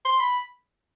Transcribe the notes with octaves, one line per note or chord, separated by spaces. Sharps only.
C6
B5